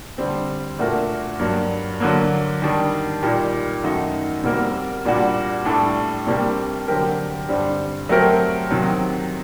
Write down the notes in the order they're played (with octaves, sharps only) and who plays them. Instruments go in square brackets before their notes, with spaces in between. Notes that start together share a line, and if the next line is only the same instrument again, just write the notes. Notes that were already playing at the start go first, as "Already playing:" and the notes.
[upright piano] D3 G3 C4
A#2 A3 D4 F#4 A#4
G2 F#3 A#3
D3 F#3 A#3
D#3 G3 D4
A#2 G3 A#3 D#4 G4
F#2 D#3 A3 D#4 F#4
C3 G3 A#3 F#4 A#4
A#2 G3 D4 F#4
A2 G3 D4 A4
C3 G3 A#3 D4 G4
D3 F#3 C4 G4 A#4
G2 D3 G3 C4
F#3 A3 C4 G4 A#4
C3 D#3 F#3